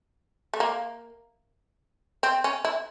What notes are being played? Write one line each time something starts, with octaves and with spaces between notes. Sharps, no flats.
A3
A#3
C4
C#4
E4